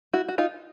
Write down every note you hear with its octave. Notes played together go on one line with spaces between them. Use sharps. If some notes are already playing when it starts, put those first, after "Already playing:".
E4 F#4
F#4
D#4 F4